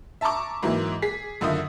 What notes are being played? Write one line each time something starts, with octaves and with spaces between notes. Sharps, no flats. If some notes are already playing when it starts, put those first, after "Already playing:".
E5 A5 A#5 C#6 D6
G#2 E3 F#3 A#3 E4
G#4 B6 C7
F#2 D3 D#3 F4 E5 D#6